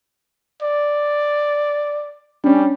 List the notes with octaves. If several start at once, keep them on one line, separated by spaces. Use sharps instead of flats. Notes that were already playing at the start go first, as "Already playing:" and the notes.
D5
G3 C#4 D4